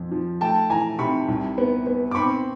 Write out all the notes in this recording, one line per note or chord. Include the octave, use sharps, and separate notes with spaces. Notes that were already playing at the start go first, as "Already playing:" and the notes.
Already playing: F2 F3
F3
A3 G5 A5
E3 G#5 A#5
C3 B5 C#6
C2
B3
B3
D6
C4 B5 C#6